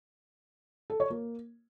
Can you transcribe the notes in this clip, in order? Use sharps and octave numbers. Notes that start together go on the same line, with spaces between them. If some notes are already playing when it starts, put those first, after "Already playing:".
A4
C#5
A#3